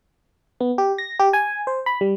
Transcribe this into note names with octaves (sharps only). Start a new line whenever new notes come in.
B3
G4
A#6
G4
G#5
C5
B5
G3